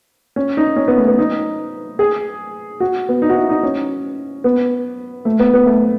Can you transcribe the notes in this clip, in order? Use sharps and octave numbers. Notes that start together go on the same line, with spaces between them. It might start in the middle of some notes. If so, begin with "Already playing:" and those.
C#4
D#4
C#4
B3
A3
B3
D#4
G#4
F#4
B3
D#4
F#4
E4
D#4
C#4
B3
A3
B3
B3
A3